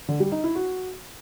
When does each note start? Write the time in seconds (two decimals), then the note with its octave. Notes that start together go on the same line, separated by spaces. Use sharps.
0.08 D3
0.20 G3
0.32 D#4
0.44 E4
0.55 F#4